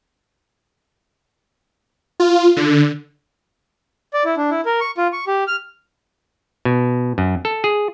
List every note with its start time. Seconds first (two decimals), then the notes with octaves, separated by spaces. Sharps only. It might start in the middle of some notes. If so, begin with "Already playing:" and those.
2.20 F4
2.56 D3
4.13 D5
4.25 E4
4.37 D4
4.50 E4
4.66 A#4
4.81 C#6
4.98 F4
5.13 C#6
5.27 G4
5.47 F6
6.65 B2
7.18 F#2
7.45 A4
7.64 G#4